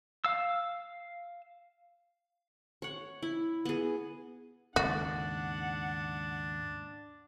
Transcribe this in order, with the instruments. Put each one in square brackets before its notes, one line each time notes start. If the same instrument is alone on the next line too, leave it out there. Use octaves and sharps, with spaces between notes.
[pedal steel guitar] F5 E6
[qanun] C#5 F#5
E4
B3 G#4
[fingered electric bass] D#2 G#2 C#3 [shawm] D4 [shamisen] F#4 [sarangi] F#5